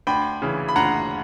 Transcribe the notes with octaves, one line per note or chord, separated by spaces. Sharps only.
D2 G5 B5
C#3 E3
B5
D2 F#5 A#5